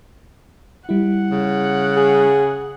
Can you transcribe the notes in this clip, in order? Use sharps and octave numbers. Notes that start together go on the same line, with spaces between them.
G3 E4 F#5
C#3
G#4